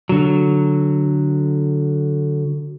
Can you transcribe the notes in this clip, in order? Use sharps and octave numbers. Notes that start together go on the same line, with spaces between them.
D3 F#3